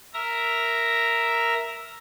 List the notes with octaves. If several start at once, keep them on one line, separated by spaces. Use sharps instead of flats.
A#4 E5 A#5 A#6